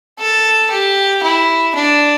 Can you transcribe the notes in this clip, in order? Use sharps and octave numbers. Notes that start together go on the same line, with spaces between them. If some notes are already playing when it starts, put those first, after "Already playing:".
A4
G4
E4
D4